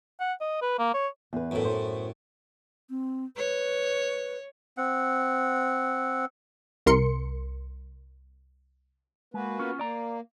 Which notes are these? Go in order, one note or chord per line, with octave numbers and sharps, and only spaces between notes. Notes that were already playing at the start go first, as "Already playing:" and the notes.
F#5
D#5
B4
A#3
C#5
E2 B4
F#2 A2
C5
C4
B4 C#5
C4 F#5
C2 A#4 C6 C#7
G#3 A#3 F#4 B4
B3 C#4 F4
A#3 D5 A#5